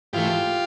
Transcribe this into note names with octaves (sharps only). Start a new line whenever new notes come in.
G#2 E3 A3 F4 G4